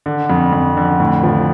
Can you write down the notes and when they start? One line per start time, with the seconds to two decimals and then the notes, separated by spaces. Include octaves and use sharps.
0.06 D3
0.30 F2
0.53 F2
0.77 D3
1.00 A2
1.23 F3